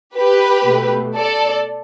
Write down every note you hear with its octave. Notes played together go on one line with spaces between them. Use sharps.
G4 B4
B2 A3
A4 D5